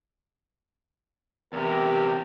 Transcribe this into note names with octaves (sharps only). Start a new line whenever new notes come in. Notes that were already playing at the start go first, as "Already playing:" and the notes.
E2 C3 G4 A#4